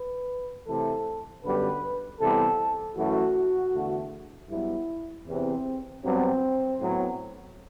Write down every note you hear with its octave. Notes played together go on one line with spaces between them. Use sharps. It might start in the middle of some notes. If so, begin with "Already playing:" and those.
Already playing: B4
C3 E3 A3 A4
F#2 D3 G3 B3 B4
C3 E3 G3 B3 A4
F#2 E3 A3 F#4
E2 D3 A3
G2 F#3 B3 E4
E2 C3 E3 C4
G2 F#3 B3 C4
A2 F#3 B3